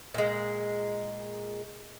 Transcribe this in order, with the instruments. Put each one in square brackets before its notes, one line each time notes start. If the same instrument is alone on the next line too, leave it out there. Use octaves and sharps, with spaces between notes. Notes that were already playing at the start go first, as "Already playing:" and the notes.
[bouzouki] A#2 G#3